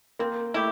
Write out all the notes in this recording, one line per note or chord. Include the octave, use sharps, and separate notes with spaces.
A#3 C4
A3 E4 G4